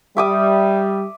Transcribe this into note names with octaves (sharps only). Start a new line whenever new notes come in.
G3 E5 D6 D#6